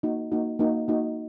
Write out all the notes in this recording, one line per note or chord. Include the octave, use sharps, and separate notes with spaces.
A#3 D#4 F#4
A#3 D#4 F#4
A#3 D#4 F#4
A#3 D#4 F#4